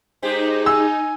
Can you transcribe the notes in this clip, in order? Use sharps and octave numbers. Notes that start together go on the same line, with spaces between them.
G#3 D#4 G4 C5
G#5 E6